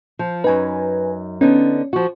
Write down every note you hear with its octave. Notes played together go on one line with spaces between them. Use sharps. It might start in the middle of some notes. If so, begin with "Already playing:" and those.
F3
F#2 D#4 B4 G#5
D3 B3 C#4 D#4
F3 F#4